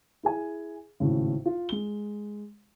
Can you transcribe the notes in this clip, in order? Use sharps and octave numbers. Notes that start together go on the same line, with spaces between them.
E4 G#4 G#5
G#1 A2 C#3
F4
G#3 G7